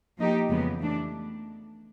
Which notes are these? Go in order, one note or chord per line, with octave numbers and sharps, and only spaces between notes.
F3 A#3 D#4 G4
F2 C#3 E3 G#3 B3
E3 A3 D4